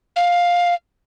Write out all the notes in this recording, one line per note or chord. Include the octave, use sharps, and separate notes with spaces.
F5